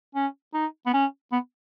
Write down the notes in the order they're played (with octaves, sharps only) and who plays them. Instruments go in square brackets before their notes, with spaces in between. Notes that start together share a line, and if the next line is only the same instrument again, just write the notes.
[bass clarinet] C#4
D#4
B3
C#4
B3